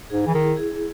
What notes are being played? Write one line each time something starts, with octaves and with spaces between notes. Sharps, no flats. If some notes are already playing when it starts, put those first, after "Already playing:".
G#2 G#4
E3
D#3 E4
G#4